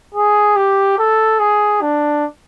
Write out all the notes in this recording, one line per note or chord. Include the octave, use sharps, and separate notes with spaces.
G#4
G4
A4
G#4
D4